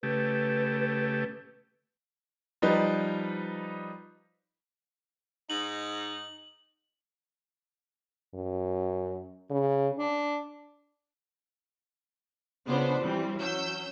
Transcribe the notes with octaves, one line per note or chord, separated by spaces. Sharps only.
C#3 A3 G4 B4
F3 G3 D#4 B4
G#2 D#4 F#7
F#2
C#3
D4
C#3 B3 D4 F4 B4 C5
E3 G3 C4
F#3 C#4 E6 G6